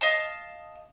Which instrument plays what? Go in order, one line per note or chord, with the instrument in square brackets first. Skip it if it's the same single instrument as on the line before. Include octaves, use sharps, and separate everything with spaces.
[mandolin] D#5 F5 A5